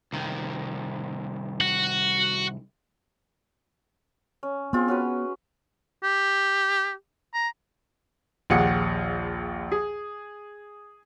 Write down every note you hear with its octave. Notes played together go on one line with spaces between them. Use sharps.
C2 D#3
F#4
C#4
B3 C4 F4 G#4
C#4 F#4 B4
G4
A#5
A#1 D#2 G#4 F#5 C#7
G#4